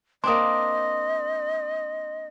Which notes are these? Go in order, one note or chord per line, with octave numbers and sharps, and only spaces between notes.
A#3 C4 D4 D#5 C6 D#6